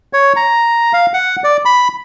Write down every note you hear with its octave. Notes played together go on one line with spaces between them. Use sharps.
C#5
A#5
F5
F#5
D5
B5